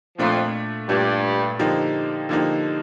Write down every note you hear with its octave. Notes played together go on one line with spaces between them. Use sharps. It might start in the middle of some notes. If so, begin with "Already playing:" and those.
F2 A#2 F3 A3 D4
G2 A#2 G3 A3 D4
D3 F3 A#3 D#4 G4
D3 F3 A#3 D#4 G4